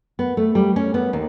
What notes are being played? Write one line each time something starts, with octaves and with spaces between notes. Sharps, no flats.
B3
A3
G3
C#4
B3
D#2